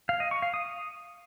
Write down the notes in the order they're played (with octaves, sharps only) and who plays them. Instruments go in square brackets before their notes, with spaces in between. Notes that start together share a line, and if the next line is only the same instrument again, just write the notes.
[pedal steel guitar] F5
D#5
C#6
F5
D#6